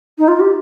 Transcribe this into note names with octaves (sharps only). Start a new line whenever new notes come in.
D#4
F4
G4